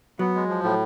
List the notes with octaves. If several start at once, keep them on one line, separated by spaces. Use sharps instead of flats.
F#3 B3
G#3
F3
A2